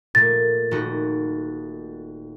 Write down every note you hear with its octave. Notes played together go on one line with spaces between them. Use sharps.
A#2 A3 A6
D#1 D#4 F#4